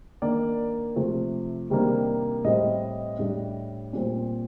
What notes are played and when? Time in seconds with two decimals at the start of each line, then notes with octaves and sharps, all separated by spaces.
0.22 D#3 A#3 D4 D5
0.96 C3 F3 A3
1.70 C3 D#3 G3 A#3 D4
2.44 A2 G3 C4 D#5
3.19 A2 G3 D4
3.93 A#2 G3 C4